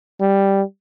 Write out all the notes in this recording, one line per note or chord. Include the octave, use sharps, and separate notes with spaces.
G3